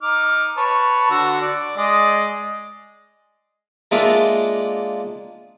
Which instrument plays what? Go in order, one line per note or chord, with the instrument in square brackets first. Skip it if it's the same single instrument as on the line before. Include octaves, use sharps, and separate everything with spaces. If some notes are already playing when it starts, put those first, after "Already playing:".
[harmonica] D#4 D6 F6
B4 C#5 A5
D3 F#4 E6
D5
G#3 D5 D#5
[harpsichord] G#3 A#3 D4 F4 D5 E5